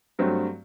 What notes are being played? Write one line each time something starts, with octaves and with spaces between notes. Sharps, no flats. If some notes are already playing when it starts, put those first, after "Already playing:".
G2 F#3 A3 C4